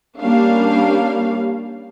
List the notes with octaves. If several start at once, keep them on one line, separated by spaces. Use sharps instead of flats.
G3 A#3 C#4 D4 F5